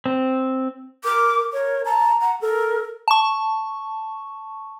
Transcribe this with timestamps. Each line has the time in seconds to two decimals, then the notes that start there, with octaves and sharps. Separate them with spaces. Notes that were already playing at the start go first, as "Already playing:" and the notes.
0.06 C4
1.04 A#4 D6
1.53 A#4 C#5
1.85 A5 A#5
2.21 F#5
2.41 A4 A#4
3.08 A5 C#6